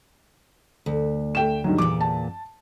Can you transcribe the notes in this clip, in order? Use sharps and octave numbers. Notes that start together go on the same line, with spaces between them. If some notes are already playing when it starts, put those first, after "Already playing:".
D2
A3 G5 E7
G2 D#3 F#3
E2 A#2 D6
A5